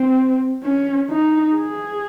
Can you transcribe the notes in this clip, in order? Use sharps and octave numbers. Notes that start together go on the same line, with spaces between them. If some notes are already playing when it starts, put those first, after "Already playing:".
Already playing: C4
C#4
D#4
G#4